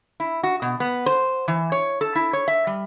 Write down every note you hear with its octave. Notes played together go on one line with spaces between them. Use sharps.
E4
F#4
B2
B3
C5
E3
C#5
A4
E4
C#5
E5
G3